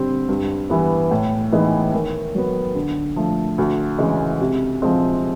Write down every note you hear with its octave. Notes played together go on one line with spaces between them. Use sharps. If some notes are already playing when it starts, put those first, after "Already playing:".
Already playing: D3 G3 C4
G2
E3 G3 B3
A2
E3 G#3 B3 D#4
D#3
F#3 B3
D3
F3 A3
D2
C#3 E3 G#3
C3
F3 G#3 C4